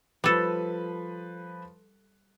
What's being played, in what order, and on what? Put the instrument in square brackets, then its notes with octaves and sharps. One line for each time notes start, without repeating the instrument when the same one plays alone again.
[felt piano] F3 B4 [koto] G3 A4